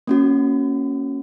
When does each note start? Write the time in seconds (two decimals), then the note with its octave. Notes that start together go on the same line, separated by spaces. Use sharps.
0.07 A#3 C#4 F#4